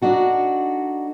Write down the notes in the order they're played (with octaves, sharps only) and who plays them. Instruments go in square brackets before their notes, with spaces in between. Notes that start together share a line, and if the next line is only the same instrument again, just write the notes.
[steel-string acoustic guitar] D4 D#4 F#4 A4